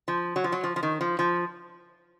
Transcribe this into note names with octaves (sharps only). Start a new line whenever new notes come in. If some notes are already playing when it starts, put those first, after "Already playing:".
F3
F#3
F3
F#3
F3
F3
D#3
F3
F3